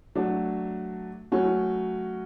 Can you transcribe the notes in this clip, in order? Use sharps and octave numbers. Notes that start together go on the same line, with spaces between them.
F#3 A3 D4 F#4
F#3 A3 C#4 F#4